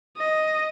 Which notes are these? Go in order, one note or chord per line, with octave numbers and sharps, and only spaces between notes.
D#5